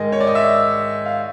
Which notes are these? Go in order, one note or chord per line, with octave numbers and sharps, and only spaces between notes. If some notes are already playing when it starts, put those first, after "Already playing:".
Already playing: G#2 D#3 G#3 D#5
C#5
D5
D#5
E5
F5